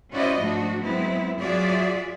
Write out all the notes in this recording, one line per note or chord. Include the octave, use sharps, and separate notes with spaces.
C#4 E4 F#4 C5 D5 D#5
G#2 F3 A3 D4 F#4
F#3 G#3 B3 C4 E4
F#3 F4 F#4 G#4 D5 E5